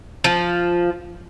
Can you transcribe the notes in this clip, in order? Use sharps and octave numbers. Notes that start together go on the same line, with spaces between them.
F3